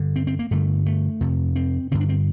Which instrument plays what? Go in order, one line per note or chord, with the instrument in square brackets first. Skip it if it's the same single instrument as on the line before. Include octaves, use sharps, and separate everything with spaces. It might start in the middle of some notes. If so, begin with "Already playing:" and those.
Already playing: [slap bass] G2 D3
C4
C4
A#3
G2 D3 A3
A3
F2 C3
C4
G2 D3 C4
D4
C4